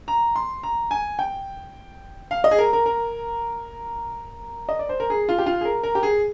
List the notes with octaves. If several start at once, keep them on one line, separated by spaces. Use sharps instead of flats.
A#5
C6
A#5
G#5
G5
F5
D#5
G#4
A#4
A#4
A#4
D#5
D5
C5
A#4
G#4
F4
G4
F4
G#4
A#4
A#4
G4
G#4